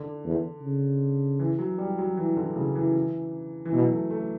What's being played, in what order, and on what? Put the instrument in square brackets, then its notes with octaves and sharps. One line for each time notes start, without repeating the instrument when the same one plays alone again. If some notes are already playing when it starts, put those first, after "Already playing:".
Already playing: [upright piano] D3
[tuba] E2
C#3
[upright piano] E3
F#3
G3
F#3
E3
D3
C#3
E3
E3
[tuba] B2 [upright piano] F#3
[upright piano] A3
A3